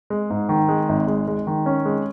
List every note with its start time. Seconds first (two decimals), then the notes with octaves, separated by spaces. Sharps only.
0.10 G#3
0.30 G#2
0.49 D#3
0.68 G#3
0.89 G#1
1.07 G#3
1.28 G#3
1.47 D#3
1.66 C#4
1.86 G#3